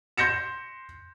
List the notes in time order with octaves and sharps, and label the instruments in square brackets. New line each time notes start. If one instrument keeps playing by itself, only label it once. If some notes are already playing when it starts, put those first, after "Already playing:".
[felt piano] C6 G6 A#6 C#7 E7